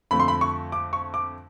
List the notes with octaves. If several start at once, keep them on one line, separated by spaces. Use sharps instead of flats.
F2 D3 F3 A3 B5
C6
B5
C#6
D6
C#6
D6